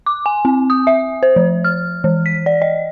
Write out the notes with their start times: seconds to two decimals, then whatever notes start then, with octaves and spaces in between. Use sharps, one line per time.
0.06 D6
0.26 G#5
0.45 C4
0.70 D#6
0.87 E5
1.23 C5
1.36 F3
1.64 F6
2.04 E3
2.26 B6
2.46 D5
2.62 D#5